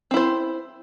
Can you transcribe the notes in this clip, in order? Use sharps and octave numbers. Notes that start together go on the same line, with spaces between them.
C4 E4 C5